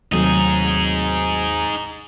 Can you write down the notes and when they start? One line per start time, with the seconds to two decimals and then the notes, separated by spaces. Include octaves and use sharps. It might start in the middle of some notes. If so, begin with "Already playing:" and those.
0.12 D#2 C3 D#3 F#3 A3 C4 D#4 G#4